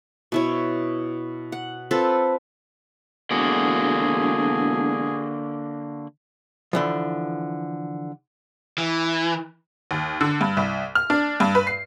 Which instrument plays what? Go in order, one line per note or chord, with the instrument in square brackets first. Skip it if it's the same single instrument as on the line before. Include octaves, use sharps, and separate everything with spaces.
[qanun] B2 E4 C#5
F#5
C4 F4 A4 B4
[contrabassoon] E1 [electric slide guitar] D3 A#3 F#4 [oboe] G#4
[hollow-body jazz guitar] D3 E3 F3
[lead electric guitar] E3
[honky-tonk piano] D#2
D3
G2
C2
F6
D4
G2
B4
C7